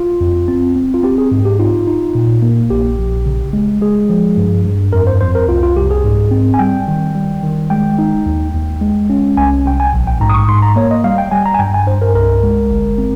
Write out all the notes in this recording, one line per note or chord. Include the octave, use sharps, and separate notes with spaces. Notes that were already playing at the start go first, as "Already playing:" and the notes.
Already playing: F4
F2
C4
C4
F4
C4 G4
G#4
G#2
G4
D#4 F4
D#4
A#2
A#3
A#1 G4
A#1
C#3
G#3
G#3 G#4
F3
G2
G2
F2 A#4
C5
F2 C5
A#4
C2 F4
F4
C2 G4
G#4
G#2
C4
G#5
G3 G5
D#3
G3
D#3
G#3 G5
D#4
D#2
D#2
G#3
C#4
C2 G#5
C2 G5
G#5
A#1
G5
G#2 A#5
D#6
C#6
G#2 C6
A#5
A#3 C#5
D#5
G3 F5
G5
G3 G#5
A#5
G#5
G2 G5
G#5
G2 C5
A#4
C2 A#4
G#3
G1
C4